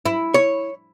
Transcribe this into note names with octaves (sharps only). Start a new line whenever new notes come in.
E4
C#5